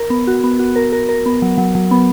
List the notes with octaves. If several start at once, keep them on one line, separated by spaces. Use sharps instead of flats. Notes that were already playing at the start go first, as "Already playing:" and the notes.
Already playing: A#4
B3
F#4
B3
F#4
A#4
A#4
A#4
B3
F#3
F#3
F#3
B3